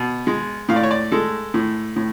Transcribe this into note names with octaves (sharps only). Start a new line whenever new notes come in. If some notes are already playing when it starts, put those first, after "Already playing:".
Already playing: B2
G#3
A2 F5
D5
C#5
D5
G#3 A4
A2
A2